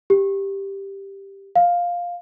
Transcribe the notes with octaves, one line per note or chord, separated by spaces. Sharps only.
G4
F5